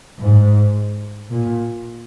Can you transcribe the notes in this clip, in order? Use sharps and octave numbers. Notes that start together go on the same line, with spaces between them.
G#2
A#2